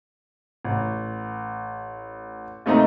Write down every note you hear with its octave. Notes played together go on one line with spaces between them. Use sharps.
A1
D#2 A3 C4 D#4 D#5 A#5